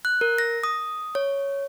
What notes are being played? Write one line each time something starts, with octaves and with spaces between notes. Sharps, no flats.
F#6
A#4
A#6
D#6
C#5